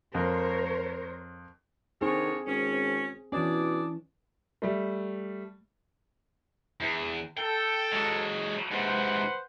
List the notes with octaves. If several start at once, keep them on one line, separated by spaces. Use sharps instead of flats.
F2 A#4 C5 C#5
D3 D#3 C4 G#4 A#4 C#5
G#1 C#4
B2 E3 C#4 D4 G#4 D5
G3 A3
E2
A4 G5
F#3 G#3
G#2 C3 B4 C5 F#5